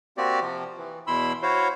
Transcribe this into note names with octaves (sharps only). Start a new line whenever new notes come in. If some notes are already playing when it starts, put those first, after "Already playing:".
A#3 C4 F#4 G4 D5
C3 F3
E3
E2 B2 E4 B5 C6 E6
E4 F#4 C5 C#5 F5